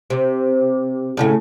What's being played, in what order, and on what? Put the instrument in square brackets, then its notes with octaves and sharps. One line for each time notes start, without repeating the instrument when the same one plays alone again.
[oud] C3
A2 C#3 A3